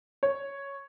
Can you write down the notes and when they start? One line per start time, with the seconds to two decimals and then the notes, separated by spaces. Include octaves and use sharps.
0.23 C#5